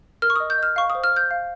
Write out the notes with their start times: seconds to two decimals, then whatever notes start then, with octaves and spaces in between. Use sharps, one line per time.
0.22 A#4 F6
0.30 C#6
0.36 D#5 D#6
0.50 G6
0.58 D#5 F6
0.76 F5 C#6
0.90 D#6
0.95 C5
1.04 F6
1.13 C5 G6
1.31 F5